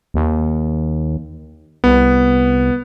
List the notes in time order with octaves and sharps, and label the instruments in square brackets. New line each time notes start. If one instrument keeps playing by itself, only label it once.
[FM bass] D#2
[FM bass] C2 [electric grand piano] B3